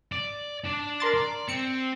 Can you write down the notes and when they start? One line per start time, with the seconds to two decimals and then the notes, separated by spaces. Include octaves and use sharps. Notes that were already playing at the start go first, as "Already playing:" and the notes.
0.12 D5
0.64 D4 D5
1.00 A#4 C6 A6
1.14 D5
1.49 C4 C#7